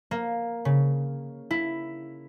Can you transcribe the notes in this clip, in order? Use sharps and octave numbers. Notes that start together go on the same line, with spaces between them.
A#3
C#3
E4